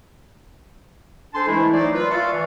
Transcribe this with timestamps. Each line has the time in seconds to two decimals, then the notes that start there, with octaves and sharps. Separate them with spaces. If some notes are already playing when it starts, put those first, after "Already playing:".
1.33 D4 A4 C5 G#5 A5 C6
1.47 E3 G#3 A3 E4
1.72 F#3 A3 D#4 C5 D5
1.93 F4 B4
2.11 D5 E5 F5 A5 C6 C#6
2.32 E3